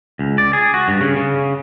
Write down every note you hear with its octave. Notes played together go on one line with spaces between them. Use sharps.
C#2
D5
G#4
F#4
G2
C#3
C#3